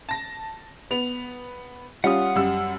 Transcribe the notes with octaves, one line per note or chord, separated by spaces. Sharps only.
A5 A#6
B3 F7
G3 C#4 F4 F#5 D#6
F#2 G3 E6